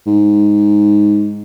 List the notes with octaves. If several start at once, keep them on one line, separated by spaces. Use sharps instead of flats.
G#2